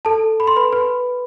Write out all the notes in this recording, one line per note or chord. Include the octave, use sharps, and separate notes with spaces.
A4 A5
B5
C6
B4 B5
B4 B5